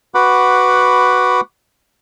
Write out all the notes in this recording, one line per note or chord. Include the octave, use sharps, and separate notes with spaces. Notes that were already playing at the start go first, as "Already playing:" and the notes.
F#4 B4 F#5 B5 D6